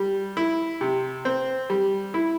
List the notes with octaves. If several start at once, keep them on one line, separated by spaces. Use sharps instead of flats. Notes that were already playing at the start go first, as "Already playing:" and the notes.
Already playing: G3
E4
C3
C4
G3
E4